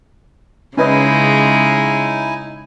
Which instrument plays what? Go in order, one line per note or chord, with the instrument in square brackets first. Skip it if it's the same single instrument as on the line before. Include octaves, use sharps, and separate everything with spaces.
[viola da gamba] C#3 G#3 [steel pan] C#4 B4 D#5 [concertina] D#4 E4 G#5